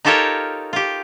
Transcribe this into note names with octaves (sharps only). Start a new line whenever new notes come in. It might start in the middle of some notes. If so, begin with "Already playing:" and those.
D#4 F4 G4 A4 A#4 C#5
F4 G4